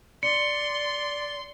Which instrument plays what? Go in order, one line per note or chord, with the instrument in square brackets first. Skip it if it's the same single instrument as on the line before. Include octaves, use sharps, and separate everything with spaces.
[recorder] D5 [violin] C6 [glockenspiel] C#7